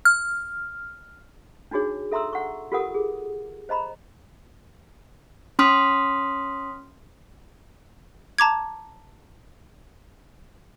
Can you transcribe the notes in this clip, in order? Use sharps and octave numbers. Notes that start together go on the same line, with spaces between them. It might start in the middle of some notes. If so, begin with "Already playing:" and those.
F6
D4 D#4 F#4 G#4 C#5
A4 E5 A#5 C6 E6
F#5 C#6
F4 G4 A4 A#4 F#5 D#6
G#4
C5 D#5 A#5 B5
C#4 C6 D#6 F6 B6
A5 A#5 D6 G#6